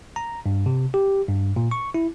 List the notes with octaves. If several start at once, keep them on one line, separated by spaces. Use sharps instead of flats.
A#5
G2
C3
G4
G2
A#2
C#6
E4